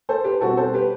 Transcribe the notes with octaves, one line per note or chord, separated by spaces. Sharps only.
A4 C5
G4 B4
B2 G3 C4 F#4 A4
A4 C5
G4 B4